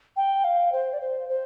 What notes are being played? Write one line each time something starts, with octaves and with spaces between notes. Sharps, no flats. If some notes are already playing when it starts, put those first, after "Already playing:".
G5
F5
C5
D5
C5
C5